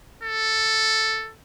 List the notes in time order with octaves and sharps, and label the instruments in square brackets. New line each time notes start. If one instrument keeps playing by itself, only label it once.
[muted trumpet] A4